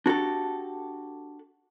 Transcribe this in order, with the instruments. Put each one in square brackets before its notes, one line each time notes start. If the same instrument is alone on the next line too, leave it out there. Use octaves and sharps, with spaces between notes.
[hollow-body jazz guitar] D4 F#4 G4 A4